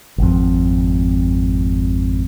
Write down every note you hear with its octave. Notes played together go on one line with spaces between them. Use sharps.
G#1 F2